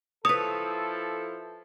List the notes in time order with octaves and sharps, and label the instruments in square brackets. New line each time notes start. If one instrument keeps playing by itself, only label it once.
[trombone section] F3 E4 A4 [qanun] B4 C#5 [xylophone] D#6